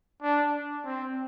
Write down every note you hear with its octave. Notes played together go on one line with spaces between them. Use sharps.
D4
C4